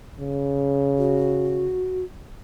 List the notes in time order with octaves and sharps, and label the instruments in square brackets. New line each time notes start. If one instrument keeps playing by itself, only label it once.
[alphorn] C#3
[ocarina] F#4